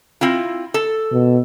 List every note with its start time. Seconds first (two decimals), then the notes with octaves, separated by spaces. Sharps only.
0.21 C4 E4 F4
0.74 A4
1.12 B2